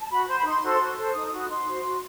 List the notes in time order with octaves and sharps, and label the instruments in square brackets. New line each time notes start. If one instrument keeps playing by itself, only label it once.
[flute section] A5
F#4 B5
C5 C6
B5
D#4 C6
F#4 A4 C5
F#4
A4 C5
D#4 D#6
D#6
F#4 B4
D#6
D#4 C6
F#4 C5
F#4